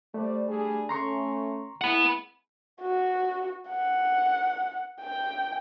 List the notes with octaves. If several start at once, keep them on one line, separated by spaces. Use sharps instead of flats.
G3 A3 C5 D5
G3 D4 G#4
A3 C#4 A#5 C6 C#6
G#3 B3 E4 F#5 B5
F#4
F#5
G5